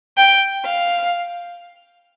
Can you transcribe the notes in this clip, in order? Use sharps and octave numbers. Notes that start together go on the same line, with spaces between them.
G5
F5